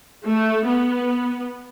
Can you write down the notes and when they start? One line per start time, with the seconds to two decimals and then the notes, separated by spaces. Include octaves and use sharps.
0.25 A3
0.67 B3